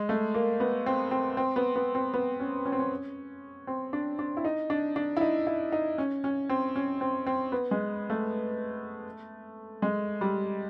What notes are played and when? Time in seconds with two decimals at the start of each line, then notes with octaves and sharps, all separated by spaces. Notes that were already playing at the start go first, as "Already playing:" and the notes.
Already playing: G#3
0.09 A3
0.34 A#3
0.60 B3
0.86 C4
1.11 C4
1.37 C4
1.56 B3
1.76 B3
1.95 C4
2.14 B3
2.40 C#4
2.65 C#4
2.72 C4
2.79 C#4
3.67 C4
3.93 D4
4.19 D4
4.37 E4
4.45 D#4
4.70 D4
4.96 D4
5.17 E4
5.21 D#4
5.47 E4
5.72 D#4
5.98 C#4
6.24 C#4
6.49 C4
6.76 C#4
7.01 C4
7.27 C4
7.52 B3
7.71 G#3
8.10 A3
9.82 G#3
10.21 G3